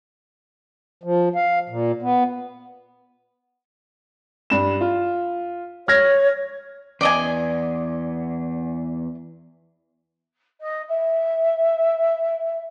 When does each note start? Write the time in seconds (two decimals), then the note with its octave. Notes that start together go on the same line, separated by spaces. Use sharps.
1.03 F3
1.35 F5
1.69 A#2
2.02 B3
4.50 G2 E7
4.81 F4
5.88 C#5 F6 G#6 A#6
7.01 E2 D5 D#5 G#5
10.60 D#5
10.88 E5